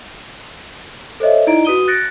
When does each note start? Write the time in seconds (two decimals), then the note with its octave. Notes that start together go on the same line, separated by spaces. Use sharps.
1.20 A4 C5 C#5 D#5 E5
1.47 D#4 E4 D5 D#5 A#5 D7
1.65 F#4 B4 D#6 D#7 G7
1.88 F#6 A6 A#6 C#7 D7